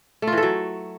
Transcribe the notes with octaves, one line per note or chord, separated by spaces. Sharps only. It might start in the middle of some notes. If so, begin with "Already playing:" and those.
A3
F4
E3
A4
F#3